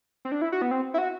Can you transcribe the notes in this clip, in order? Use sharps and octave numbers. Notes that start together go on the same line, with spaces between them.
C4
D4
E4
F#4
B3
C4
E4
F#4